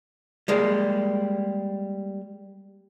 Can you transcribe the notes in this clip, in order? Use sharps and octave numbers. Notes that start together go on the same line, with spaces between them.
G3 G#3 A#3